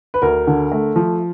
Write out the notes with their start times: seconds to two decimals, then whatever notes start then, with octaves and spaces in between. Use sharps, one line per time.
0.14 B4
0.22 D2 A#4
0.47 D3
0.72 A3
0.96 F3